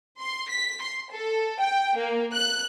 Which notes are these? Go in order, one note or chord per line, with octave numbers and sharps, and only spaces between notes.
C6
B6
C6
A4
G5
A#3
F#6